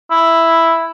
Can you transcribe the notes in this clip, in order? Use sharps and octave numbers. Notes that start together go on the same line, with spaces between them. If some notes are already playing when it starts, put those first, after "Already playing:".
E4